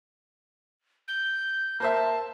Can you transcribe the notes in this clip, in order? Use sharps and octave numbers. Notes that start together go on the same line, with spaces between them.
G6
A#3 C5 E5 A5